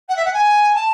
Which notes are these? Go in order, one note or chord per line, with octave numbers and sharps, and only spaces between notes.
F#5
E5
F#5
G#5
A5